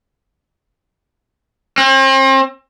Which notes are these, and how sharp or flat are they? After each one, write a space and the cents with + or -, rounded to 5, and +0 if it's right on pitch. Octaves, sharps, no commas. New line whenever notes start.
C4 +40